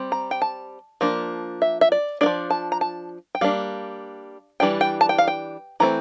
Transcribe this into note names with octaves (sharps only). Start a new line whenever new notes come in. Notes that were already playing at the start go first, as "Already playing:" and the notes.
Already playing: G3 C4
A#5
G5
A5
F3 A#3 D4
E5
E5
D5
A#3 D4 D5
F3
A5
A#5
A5
G5
G3 A#3 D4 F5
E3 G3 D4 G5
G5
A5
G5
F5
G5
E3 A3 C4 A#5